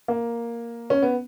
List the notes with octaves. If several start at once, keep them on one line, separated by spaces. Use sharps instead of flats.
A#3
C#4
B3